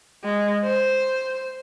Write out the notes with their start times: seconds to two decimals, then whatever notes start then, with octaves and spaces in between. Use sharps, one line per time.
0.24 G#3
0.65 C5